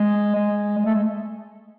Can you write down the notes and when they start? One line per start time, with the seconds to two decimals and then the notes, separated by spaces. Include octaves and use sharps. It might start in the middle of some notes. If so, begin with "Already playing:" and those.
Already playing: G#3
0.35 G#3
0.77 G#3
0.86 A3
0.94 G#3